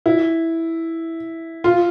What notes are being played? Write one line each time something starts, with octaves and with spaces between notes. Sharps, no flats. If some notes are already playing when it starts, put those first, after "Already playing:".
E4
F4